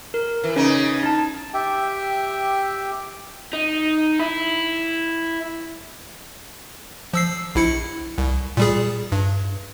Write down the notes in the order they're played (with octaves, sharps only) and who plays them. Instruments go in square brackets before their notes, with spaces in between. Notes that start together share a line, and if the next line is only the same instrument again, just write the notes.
[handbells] A#4
[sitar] E3
[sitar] C#3 D#4 [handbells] C#4
[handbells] D#4 A5
[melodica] G4 E5 G5
[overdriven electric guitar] D#4
E4
[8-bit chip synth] F3 E6 C7
A#1 E4 C#7
C2
A#2 G3 G#4
G2